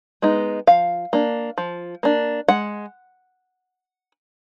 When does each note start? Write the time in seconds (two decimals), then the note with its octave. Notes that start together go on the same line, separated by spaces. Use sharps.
0.22 G#3 B3 D#4
0.67 F3 F5
1.13 A#3 D4
1.58 F3
2.03 A#3 D4
2.48 G#3 F#5